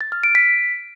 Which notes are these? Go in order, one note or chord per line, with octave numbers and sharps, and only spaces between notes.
A6
F6
D7
B6